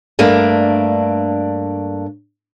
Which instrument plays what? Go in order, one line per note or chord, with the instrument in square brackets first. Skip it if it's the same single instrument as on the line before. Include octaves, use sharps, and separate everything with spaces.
[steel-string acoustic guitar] G2 A3 A#3 D4